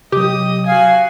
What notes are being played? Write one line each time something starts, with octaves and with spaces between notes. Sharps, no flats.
C3 F#3 G4 D#5 D#6
F#4 F5 G#5